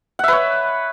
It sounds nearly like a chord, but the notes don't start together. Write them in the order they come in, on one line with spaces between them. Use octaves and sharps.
F#5 E5 B4 C#5